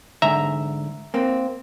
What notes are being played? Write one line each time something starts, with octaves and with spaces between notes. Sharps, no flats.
G#2 D3 E5 A#5
A#3 C4